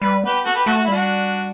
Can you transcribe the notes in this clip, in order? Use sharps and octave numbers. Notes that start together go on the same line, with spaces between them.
G3 B4
B3 G4 B4
F#4 A4
G4 B4
A3 F#4 A4
F#4
E4
G3 D4 F#4